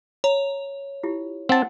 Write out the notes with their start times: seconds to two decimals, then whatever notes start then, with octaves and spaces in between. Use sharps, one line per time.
0.24 C#5 A#5
1.03 E4 F4 G4
1.49 C4 F#5 G5 A5